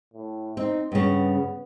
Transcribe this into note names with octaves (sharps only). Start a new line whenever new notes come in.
A2
C4 D#4
G2 C#3 B3